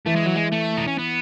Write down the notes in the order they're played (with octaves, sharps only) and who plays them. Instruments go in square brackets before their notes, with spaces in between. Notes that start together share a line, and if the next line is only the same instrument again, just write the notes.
[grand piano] E3 [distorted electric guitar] A3
[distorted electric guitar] G#3
F#3
G#3
A3
D#4
C#4
B3